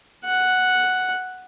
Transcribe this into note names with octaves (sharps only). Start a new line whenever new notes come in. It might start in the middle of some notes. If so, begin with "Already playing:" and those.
F#5